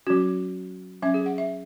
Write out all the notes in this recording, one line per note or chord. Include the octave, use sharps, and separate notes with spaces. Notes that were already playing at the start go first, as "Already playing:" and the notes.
F#3 C#4 F#4
F#3 C#4 E5
G#4
F#5
E5